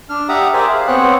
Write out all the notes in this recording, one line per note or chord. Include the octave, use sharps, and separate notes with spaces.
D4 F6
G4 D5 E5 F#5 A#5 D#6
G#4 A#4 C5 D5 E5 G#5
G#4 F5
B3 C4 C5 C#5 F#6